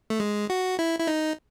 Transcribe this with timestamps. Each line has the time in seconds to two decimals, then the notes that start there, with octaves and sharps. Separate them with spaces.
0.10 A3
0.20 G#3
0.50 F#4
0.79 E4
0.99 E4
1.07 D#4